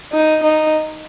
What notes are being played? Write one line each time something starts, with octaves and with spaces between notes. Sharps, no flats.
D#4
D#4